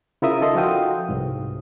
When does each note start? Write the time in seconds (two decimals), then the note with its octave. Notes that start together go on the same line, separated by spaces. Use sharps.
0.22 C#3 E4 F4 A#4 E5 D#6
0.41 D#4 A4 D#5 C6
0.55 F3 F#4 F5 G5 D#6
1.09 C2 G#2